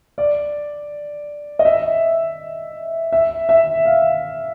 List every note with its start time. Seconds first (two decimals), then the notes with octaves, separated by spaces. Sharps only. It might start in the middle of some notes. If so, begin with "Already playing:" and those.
0.18 D5
1.59 D#5
1.65 E5
3.12 E5
3.49 E5
3.85 F5